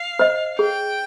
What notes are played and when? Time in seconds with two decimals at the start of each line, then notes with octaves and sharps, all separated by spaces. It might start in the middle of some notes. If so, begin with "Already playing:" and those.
Already playing: F5
0.19 C5 D#5
0.59 G#4 G5